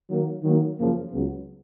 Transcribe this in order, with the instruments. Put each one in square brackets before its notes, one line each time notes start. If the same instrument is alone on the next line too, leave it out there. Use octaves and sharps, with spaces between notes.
[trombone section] D#3 F#3 A#3
D#3 F#3 A#3
F#2 C#3 F3 A#3
C#2 C#3 F#3 B3